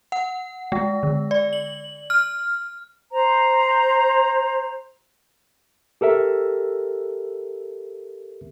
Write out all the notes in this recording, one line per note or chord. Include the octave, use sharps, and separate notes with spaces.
F#5
G#3
D3
D5
F#7
F6
C5 A#5
G4 A4 A#4 E5